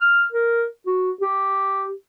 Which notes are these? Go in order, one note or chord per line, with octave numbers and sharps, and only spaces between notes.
F6
A#4
F#4
G4